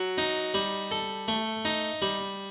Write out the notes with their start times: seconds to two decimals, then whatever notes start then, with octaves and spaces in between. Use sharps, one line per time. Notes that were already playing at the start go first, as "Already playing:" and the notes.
Already playing: F#3
0.18 D#4
0.54 G3
0.91 A4
1.28 A3
1.65 D#4
2.02 G3